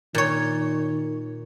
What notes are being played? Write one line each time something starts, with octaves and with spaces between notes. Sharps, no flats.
A#2 D#3 C#5